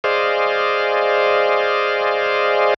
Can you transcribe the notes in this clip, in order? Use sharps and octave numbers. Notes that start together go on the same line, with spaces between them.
G#4 C5 D5 D#5 F5